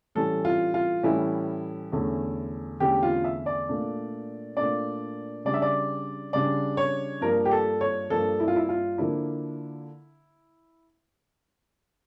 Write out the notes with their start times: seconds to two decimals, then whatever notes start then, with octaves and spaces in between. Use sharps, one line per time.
0.15 A2 E3 G3 C#4 A4
0.45 F4
0.74 F4
1.03 A2 E3 G3 C#4 E4
1.92 E2 D3 A3 C#4
2.80 E2 D3 A3 C#4 G4
3.03 F4
3.24 E5
3.46 D5
3.68 A#2 A3 D4
4.57 A#2 A3 D4 D5
5.45 C#3 G3 D4 D5
5.54 E5
5.62 D5
6.33 C#3 G3 D4 D5
6.77 C#5
7.21 G2 F3 A#3 A#4
7.45 G4
7.51 A4
7.81 C#5
8.10 G2 F3 A#3 A4
8.40 E4
8.48 F4
8.56 E4
8.69 F4
8.98 D3 F3 A#3 D4 E4